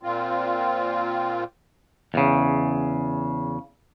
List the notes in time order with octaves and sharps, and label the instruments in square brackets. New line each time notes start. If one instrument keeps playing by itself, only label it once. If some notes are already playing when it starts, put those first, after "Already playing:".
[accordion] A#2 C4 F4
[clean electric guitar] E2 C#3